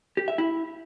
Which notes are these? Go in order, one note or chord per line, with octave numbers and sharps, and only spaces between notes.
G4
E5
E4